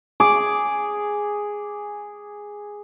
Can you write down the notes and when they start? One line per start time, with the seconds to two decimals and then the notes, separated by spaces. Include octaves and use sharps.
0.20 G#4 D6